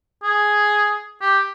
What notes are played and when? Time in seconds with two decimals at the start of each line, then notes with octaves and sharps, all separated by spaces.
0.24 G#4
1.21 G4